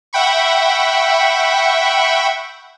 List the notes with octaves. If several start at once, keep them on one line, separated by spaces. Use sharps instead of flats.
E5 F#5 G5 B5 C#6